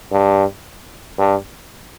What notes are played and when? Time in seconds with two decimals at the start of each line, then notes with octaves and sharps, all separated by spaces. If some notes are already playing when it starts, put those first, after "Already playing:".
0.12 G2
1.19 G2